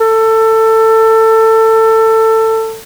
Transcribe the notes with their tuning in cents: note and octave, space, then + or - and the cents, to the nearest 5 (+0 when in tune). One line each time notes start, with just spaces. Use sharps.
A4 +20